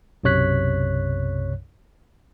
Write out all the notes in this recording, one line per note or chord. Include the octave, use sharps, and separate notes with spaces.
B1 F#2 C3 C#5 F#6 B6